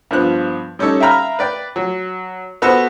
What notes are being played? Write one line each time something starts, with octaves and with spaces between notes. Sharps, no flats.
G2 F3 B3 F#6
G3 C#4 D#4 A4 C#5
E5 F5 G5 A#5 B5 F6
B4 D5 G5
F#3
B3 F#4 A4 B4 C5